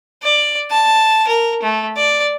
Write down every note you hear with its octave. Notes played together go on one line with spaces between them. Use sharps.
D5
A5
A#4
A3
D5